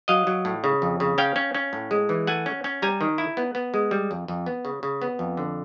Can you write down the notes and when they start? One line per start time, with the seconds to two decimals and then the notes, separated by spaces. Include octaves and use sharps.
0.08 F#3 D#5 F5
0.27 F#3
0.45 A2
0.64 C#3
0.82 F2
1.00 C#3
1.18 C#4 F5 G5
1.36 C#4
1.55 C#4
1.73 A2
1.91 G#3
2.09 E3
2.27 A3 F#5 G#5
2.46 C#4
2.64 C#4
2.82 G3 G#5 A#5
3.01 D#3
3.18 E4
3.37 B3
3.55 B3
3.74 G#3
3.91 G3
4.11 F2
4.28 F2
4.46 B3
4.65 C#3
4.83 C#3
5.02 B3
5.19 F2
5.37 D3